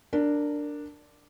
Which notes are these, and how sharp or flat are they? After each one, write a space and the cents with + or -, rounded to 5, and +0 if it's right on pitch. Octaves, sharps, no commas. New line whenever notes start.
D4 +0 A#4 -15